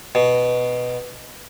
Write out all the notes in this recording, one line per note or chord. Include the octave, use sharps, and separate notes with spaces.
B2